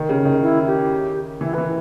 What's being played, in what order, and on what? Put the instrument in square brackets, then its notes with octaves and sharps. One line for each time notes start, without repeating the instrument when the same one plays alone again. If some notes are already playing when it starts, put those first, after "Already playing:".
Already playing: [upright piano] D#3
C#3
D#3
[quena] E4
G4
[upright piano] E3 [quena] E4
[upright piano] E3 [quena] B4